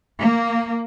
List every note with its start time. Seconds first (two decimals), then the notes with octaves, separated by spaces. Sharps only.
0.20 A#3